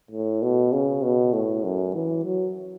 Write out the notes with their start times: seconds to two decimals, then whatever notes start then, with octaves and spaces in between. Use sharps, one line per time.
0.11 A2
0.42 B2
0.72 C#3
1.02 B2
1.33 A2
1.64 F#2
1.94 E3
2.25 F#3